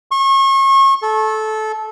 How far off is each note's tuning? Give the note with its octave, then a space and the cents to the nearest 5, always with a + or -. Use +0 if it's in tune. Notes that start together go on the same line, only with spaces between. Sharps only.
C#6 -35
A4 -20